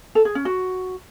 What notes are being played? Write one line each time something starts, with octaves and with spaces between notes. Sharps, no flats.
A4
G#4
C#4
F#4